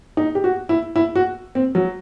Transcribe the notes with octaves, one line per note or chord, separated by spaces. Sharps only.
D#4
G4
F#4
E4
E4
F#4
C4
F#3